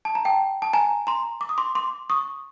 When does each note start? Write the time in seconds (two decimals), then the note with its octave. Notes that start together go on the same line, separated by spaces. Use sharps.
0.05 A5
0.15 A#5
0.25 G5 A5
0.62 A5
0.73 G#5 A#5
1.07 A#5 C6
1.41 D6
1.49 D#6
1.58 C6 D6
1.75 C6 D6
2.10 C#6 D#6